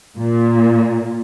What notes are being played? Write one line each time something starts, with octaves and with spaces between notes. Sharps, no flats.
A#2